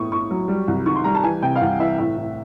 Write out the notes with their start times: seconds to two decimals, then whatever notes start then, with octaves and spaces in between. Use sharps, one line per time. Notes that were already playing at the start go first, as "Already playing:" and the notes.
Already playing: A2 B3 C#6 D#6
0.12 A2 C#6
0.31 F#3
0.48 G3
0.68 C2
0.86 D#3 C#6
0.96 C6
1.04 G3 A#5
1.15 A5
1.23 E3 G#5
1.42 C3 G5
1.56 F5
1.61 C2 F#5
1.79 E3 E5
1.98 A2 E5
2.17 A2